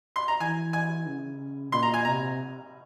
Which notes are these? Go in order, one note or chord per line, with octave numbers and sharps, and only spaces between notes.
C6
A#5
E3 G#5
G#5
C#3
A#2 C6
A#5
G#5
C3 A#5